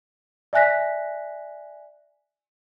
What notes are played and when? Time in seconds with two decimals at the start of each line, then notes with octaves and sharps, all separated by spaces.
0.53 D5 E5 G#5 F#6 A#6 B6